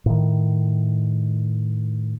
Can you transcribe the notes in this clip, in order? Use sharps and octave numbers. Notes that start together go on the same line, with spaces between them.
A2 D#3